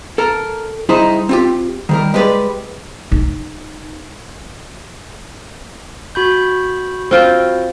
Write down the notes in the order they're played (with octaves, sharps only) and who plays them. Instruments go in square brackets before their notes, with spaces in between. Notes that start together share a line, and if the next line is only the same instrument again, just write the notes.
[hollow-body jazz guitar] A4 A#4
G2 D#4 E4 G#4 C5 C6
C4 F4 G4
D#3 G3 A#4
G#3 G4 B4 D5
[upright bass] D#4
[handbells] F#4 B5 G6
[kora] C4 F4 G5